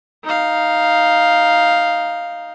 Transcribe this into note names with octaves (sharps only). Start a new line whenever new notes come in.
D#4 F5